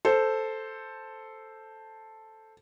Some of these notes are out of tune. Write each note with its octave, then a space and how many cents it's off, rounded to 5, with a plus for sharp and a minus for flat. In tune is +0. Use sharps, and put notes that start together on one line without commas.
A4 +0 C5 +0